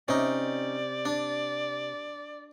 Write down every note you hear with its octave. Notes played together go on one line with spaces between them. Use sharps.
C3 C#4 D#4 D5
D4